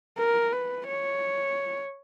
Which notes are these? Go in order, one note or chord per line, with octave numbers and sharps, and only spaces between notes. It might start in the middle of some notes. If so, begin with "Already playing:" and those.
A#4
B4
C#5